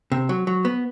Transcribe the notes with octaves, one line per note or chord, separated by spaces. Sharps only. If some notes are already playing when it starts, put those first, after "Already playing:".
C3
F#3
F#3
B3